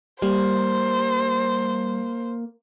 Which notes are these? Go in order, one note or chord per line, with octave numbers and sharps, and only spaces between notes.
G3 A#3 C5